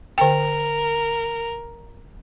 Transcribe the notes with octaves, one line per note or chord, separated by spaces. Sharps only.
D3 A#4 G5